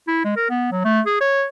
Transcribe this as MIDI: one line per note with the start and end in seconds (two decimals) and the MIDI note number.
0.08 0.20 64
0.25 0.34 56
0.36 0.49 70
0.50 0.69 59
0.72 0.83 54
0.85 1.00 57
1.06 1.17 68
1.21 1.45 73